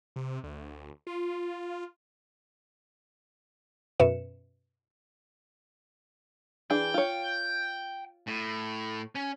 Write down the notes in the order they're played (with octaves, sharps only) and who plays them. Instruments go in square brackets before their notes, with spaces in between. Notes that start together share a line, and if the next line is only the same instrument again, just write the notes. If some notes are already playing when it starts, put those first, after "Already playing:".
[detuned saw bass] C3
D2
F4
[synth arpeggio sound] F#2 B2 B4 E5 C#7 E7
[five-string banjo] E3 D4 G#4 [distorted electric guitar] G5
[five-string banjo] F4 C#5
[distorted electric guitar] A2
C#4